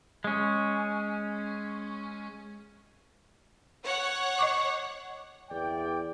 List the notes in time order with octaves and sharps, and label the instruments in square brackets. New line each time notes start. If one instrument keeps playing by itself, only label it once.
[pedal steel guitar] G#3 C#4
[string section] C#5 F#5
[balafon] D#5 C#6 D6
[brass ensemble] E2 D5 G5